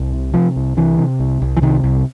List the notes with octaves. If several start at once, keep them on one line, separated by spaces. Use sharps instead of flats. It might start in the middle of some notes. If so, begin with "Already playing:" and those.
Already playing: C2
C3
C3 F3
C2
C3 E3
C3
C2
C2
E3
C3 D#3
C2